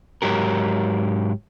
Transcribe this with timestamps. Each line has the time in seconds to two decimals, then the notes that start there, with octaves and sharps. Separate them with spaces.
0.22 G#2 F#3 G4 A#4